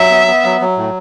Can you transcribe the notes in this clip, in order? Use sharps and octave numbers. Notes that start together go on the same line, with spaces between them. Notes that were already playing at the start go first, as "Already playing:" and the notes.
Already playing: F#3 E5
B3
B3
F#3
F#3
A2